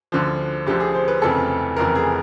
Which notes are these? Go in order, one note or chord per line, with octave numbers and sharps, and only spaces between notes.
D2 D3 F3
D2 D3 F3 G4
G#4
C5
B4
F1 F2 C#3 E3 A4
F1 F2 C#3 E3 A#4
G#4